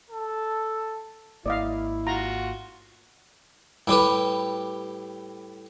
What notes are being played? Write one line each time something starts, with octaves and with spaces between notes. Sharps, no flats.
A4
G#1 A#3 E4 D5 D#5 F5
F4 F#4 A#5
A2 G3 G4 B4